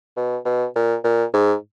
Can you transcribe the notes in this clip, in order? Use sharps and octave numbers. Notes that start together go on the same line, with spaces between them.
B2
B2
A#2
A#2
G#2